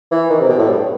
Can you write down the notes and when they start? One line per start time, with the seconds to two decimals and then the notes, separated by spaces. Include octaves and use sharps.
0.12 E3
0.30 D#3
0.41 C3
0.49 B2
0.59 A2
0.69 G2